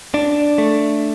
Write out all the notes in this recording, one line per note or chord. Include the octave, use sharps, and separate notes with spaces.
D4
A3